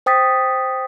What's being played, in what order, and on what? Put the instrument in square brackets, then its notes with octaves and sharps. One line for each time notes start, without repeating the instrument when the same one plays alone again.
[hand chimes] C5 G5 D#6 A6 B6